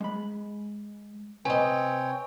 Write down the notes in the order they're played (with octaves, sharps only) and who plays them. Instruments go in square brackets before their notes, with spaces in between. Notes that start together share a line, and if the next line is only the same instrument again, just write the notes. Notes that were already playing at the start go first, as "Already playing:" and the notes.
[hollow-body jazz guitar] G#3 B5
[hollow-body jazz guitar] C3 [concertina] C4 C#5 G5 [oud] B4 D#5 [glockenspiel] G#5